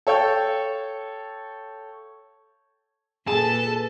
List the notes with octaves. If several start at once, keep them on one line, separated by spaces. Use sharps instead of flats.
A4 C#5 F5 G5
A#2 G#4 A4 B4 A5